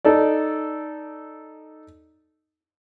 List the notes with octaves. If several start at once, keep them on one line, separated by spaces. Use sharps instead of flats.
D#4 A4 D5